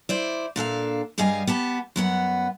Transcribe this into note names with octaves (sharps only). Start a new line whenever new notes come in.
E4 C5 D5
A#2 D4 A4 F5
G2 G3 G#4 D#5 F5 G#5
B3 G4 A5
F#2 B3 F#5